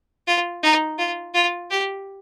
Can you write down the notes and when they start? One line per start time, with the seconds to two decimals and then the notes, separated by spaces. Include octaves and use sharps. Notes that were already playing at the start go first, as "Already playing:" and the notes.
0.27 F4
0.63 D#4
0.98 F4
1.34 F4
1.70 G4